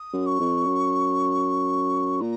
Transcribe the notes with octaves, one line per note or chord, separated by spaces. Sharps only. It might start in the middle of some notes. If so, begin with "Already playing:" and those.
Already playing: D#6
F#2
C#6
F2
F#2
A#2 A#5